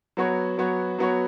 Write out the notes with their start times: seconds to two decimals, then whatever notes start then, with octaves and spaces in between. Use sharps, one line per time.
0.17 F#3 B3 F#4 C#5
0.58 F#3 B3 F#4 C#5
0.99 F#3 B3 F#4 C#5